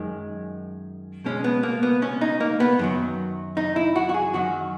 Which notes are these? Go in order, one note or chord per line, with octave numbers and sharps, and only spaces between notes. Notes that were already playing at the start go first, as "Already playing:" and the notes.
Already playing: F#2 D#3 G#3
B2 G#3 C#4
B3
A#3
B3
C#4
D#4
A#3
B3
F#2 D#3 F#3
D#4
E4
F#4
F#4
G#4
F#2 D#3 F#3 F#4